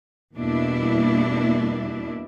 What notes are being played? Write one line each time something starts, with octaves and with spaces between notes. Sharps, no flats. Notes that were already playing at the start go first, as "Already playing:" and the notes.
E2 B2 G3 A#3 D4 E4